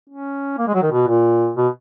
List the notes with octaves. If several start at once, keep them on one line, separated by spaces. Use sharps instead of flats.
C#4
A#3
G#3
F#3
D#3
B2
A#2
B2